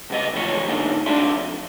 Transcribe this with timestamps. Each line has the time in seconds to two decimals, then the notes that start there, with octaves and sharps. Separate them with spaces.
0.10 C#2 G2 B3 D#5
0.33 C#2 A2 E3 F3 G#4 C#5
0.65 G#2 D3 A#3 D#4
1.06 C2 A2 D4 D5 E5 C6
1.35 F2